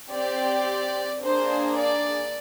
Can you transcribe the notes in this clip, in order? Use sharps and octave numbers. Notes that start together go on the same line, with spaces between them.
C4 G4 D5
A#3 D4 G#4 C5
D5